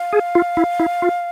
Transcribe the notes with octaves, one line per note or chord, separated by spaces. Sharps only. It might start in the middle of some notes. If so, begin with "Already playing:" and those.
Already playing: F5
G#4
F4
E4
E4
F4